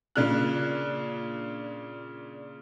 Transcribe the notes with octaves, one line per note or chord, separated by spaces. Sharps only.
A#2 C#3 D4 F6 F#6